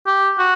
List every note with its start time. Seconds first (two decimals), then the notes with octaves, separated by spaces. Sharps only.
0.06 G4
0.39 F#4